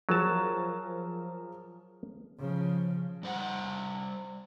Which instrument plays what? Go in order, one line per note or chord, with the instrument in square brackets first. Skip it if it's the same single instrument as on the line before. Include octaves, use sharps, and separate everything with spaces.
[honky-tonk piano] F3 G#4 A#4 [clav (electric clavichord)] F#3 A5
[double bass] C#3 F3
[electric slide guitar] G3 C5 F#5